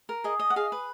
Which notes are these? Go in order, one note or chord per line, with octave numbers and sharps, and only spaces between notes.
A#4
G#4 D#5
D#5
F#5
G#4 F5
B4